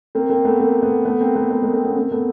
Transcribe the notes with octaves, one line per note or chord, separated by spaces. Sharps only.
A#3 C4
A#3 C4
A3 B3
A#3 C4
A3 B3
A3 B3
A#3 C4
A3 B3
A3 B3
G#3 A#3
A#3 C4
B3 C#4
A#3 C4
A3 B3